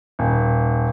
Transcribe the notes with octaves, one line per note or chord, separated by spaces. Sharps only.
D#1